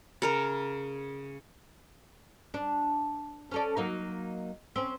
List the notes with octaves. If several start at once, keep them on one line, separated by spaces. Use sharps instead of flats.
C#3 A#4 A#5
D4
C#4 A4 D5
F#3 A#3 D#4
C4 C#4